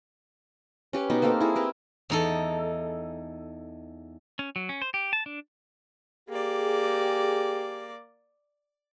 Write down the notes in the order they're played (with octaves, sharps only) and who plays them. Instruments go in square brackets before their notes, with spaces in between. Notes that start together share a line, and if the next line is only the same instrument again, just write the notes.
[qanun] C#4 G4 B4
B2 B3 D#4 D6
A#3 C4 A4 F5
E4 G#4
C4 G4 A#4 B4
[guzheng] E2 D#4 A4
[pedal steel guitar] C#4
F#3
C#4
C5
G4
A5
D4
[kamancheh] A#3 D5 [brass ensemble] G4 G#4